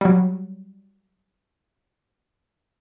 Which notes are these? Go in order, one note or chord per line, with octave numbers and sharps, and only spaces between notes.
F#3 G3